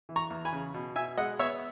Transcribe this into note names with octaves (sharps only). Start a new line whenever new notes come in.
E3
A#5 C#6
E2
G#5 B5
C#3
B2
B2 E5 G#5
G#3 D#5 F#5
B3 C#5 E5